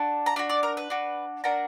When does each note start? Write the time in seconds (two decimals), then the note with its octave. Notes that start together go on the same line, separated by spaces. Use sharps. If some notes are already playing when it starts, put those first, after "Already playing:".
Already playing: D4 F#4
0.26 A#5
0.36 D4 F#4 B5
0.49 D5
0.63 A#4
0.77 B4
0.90 D4 F#4
1.44 A#3 D4 F#4 A#5